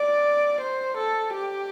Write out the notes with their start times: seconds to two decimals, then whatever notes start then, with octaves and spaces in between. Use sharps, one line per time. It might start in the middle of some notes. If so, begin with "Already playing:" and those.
Already playing: D5
0.61 C5
0.98 A4
1.34 G4